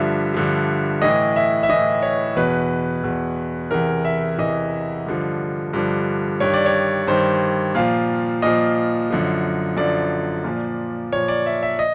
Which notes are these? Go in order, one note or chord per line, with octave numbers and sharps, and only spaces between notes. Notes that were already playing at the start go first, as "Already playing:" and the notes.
Already playing: G2 D3 F3 E5
G2 D3 F3
A2 E3 D#5
E5
E5
A2 E3 D#5
C#5
E2 B2 B4
E2 B2
E2 C3 E3 A#4
E5
E2 C3 E3 D#5
G2 D3 F3
G2 D3 F3
G2 D#3 C#5
D5
C#5
G2 D#3 C5
A#2 F3 F5
A#2 F3 D#5
F#2 D3 F3
F#2 D3 F3 D5
A#2 F3
A#2 F3 C#5
D5
E5
E5
D#5